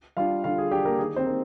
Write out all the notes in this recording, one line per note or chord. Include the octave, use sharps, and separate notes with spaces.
G3 D4 F4 F5
D3 F4 F5
G#4
G3 D4 G4
A#3 A#4
D#3 G#4
C4 C5
A#3 D#4